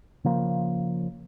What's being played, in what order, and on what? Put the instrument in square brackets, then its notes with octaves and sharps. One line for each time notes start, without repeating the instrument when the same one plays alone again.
[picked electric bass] C#3 F3 A#3